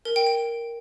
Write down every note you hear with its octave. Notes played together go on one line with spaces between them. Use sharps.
A#4
G5
G5